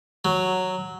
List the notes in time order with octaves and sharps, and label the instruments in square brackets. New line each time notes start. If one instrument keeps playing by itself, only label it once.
[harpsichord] F#3